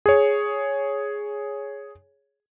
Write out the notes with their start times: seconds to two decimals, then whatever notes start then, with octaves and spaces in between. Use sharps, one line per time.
0.06 G#4 C#5